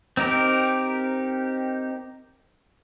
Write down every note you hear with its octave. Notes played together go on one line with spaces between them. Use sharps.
C4 D#4 G4 A#4